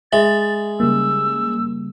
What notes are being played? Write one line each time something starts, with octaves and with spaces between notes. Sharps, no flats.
G#3 E5 B5 A6
C#3 G3 A#3 E6